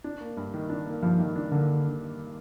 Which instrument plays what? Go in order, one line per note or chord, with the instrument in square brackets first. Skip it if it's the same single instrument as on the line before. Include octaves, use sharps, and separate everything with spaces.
[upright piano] D4
A#3
G2
D#3
D4
A#3
[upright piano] G2 [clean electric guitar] F3
[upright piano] D#3
D4
[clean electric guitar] D3 [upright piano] A#3